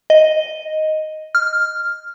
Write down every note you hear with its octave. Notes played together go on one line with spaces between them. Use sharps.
D#5
F6